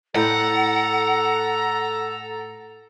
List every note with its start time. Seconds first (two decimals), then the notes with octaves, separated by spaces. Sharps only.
0.15 A2 A4 F#5 G5 A#5